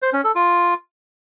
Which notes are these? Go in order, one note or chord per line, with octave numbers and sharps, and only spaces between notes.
C5
C#4
A4
F4